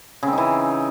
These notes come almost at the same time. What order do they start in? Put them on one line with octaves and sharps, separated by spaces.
C#3 C4 D#4 E3